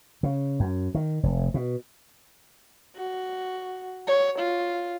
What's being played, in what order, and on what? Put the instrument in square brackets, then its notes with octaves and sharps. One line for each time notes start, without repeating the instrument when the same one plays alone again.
[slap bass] C#3
F#2
D#3
F1
B2
[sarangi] F#4
C#5
F4